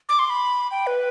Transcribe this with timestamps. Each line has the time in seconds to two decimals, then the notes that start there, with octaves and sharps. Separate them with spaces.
0.09 D6
0.19 C6
0.30 B5
0.71 G5
0.87 B4